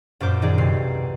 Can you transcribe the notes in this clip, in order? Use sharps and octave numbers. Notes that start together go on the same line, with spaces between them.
F#2 A#2 C5 D6 G6
D#3 D#4 G#4 D5
B1 A2 C3 C7